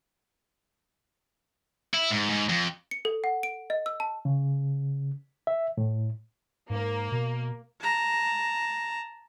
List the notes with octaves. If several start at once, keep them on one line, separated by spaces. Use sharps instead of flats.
E4
G#2
G#2
F2
C#7
A4
F#5
D7
D#5
E6
A5
C#3
E5
A2
G#2 A#3
B2
A5 A#5